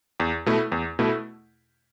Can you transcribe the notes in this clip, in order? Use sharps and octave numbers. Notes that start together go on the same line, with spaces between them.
E2
B2 A3 E4
E2
B2 A3 E4